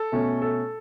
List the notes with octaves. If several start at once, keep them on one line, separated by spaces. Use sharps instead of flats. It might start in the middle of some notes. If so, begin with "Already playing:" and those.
Already playing: A4
B2 A3 C#4
A4